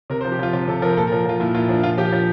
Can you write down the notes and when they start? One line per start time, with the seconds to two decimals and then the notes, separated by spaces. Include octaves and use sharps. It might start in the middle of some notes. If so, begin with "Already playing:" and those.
0.10 C3 A#4
0.21 C5
0.25 F3
0.32 G4
0.39 F3 F4
0.53 C3 F4
0.68 C3 A4
0.82 F3 A#4
0.97 A#2 A4
1.07 A#4
1.12 F3
1.25 F3 F4
1.40 A#2 E4
1.54 A#2 F4
1.68 F3 D4
1.83 A#2 F4
1.97 F3 G4
2.12 F3